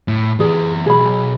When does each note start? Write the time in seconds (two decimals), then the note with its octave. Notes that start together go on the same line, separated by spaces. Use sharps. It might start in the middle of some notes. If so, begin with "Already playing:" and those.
0.08 A2
0.40 E3 G#4 D5
0.86 B1 G#4 B5